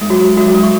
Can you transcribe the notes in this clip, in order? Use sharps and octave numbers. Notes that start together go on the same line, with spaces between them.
G#3
F#3 F#4
G#3 F#4
F#3
G#3
C#6